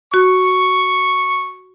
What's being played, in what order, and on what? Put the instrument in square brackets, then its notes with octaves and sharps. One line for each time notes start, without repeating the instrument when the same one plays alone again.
[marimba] F#4 [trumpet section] C#6